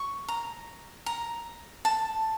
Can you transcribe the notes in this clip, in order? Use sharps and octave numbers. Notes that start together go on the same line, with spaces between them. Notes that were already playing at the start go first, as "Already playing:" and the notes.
Already playing: C#6
A#5
A#5
A5